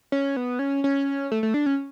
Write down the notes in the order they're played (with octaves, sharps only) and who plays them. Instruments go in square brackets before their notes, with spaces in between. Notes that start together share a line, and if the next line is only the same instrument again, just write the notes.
[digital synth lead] C#4
B3
C#4
C#4
A3
A3
D4
C#4